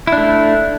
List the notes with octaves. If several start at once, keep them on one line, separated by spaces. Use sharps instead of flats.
A3 D4 E4